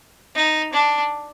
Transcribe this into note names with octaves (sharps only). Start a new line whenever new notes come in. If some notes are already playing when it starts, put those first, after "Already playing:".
D#4
D4